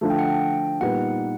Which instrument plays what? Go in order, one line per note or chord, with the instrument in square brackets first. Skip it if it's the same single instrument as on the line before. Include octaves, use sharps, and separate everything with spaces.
[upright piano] D3 F3 A3
[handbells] G5
F#5
G5
[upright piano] A#2 G3 B3 D#4 [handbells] F#5